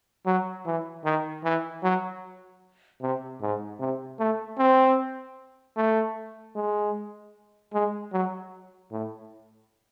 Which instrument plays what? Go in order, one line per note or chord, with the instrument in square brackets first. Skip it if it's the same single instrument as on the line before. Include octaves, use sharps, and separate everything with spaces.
[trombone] F#3
E3
D#3
E3
F#3
C3
G#2
C3
A3
C4
A3
G#3
G#3
F#3
A2